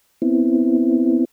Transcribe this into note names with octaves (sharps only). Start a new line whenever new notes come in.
B3 C4 E4